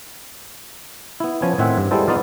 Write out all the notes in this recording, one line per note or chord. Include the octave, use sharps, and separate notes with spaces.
B3 E4
F3 B3 C#4 G#5
A2 D#3 C4 E5 F#5 G#5
G2
G3 G#3 B3 E4 A4 C5
B3 D#4 F4 D5 F5